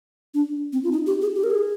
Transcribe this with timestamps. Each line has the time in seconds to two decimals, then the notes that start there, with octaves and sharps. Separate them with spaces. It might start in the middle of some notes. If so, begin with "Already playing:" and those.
0.34 D4
0.73 C4
0.84 F4
0.92 D#4
1.07 G4
1.21 G#4
1.36 G4
1.44 A#4
1.50 G#4